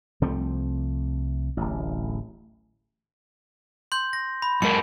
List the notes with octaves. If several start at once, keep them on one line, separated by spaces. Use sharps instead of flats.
C2 F3 A3 C4
D1 A1
C6 G6
A#6
B5
F#2 G#3 A#4 C#7